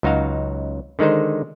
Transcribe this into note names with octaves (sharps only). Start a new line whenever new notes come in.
C#2 F#3 D#4 F#4 F5
D3 D#3 G#3 D#4 C5